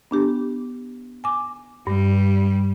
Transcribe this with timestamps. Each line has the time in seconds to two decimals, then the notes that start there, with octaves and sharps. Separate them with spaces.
0.11 B3 D4 G4
1.24 G#5 D6
1.87 G2 G3